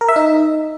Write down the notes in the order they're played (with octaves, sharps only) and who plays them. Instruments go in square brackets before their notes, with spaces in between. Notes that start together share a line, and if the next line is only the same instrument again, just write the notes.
[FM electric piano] A#4
E5
D#4